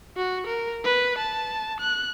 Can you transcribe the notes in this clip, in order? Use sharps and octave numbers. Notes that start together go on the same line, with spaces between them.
F#4
A#4
B4
A5
F#6